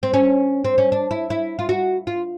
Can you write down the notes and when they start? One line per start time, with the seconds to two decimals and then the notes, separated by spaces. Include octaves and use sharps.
0.03 C4
0.14 C#4
0.65 C4
0.78 C#4
0.92 D4
1.11 E4
1.30 E4
1.59 F4
1.69 F#4
2.07 F4